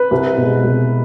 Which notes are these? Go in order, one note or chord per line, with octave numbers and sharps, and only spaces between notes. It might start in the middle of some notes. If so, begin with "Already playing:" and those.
Already playing: B4
C2
B2 G#3
C2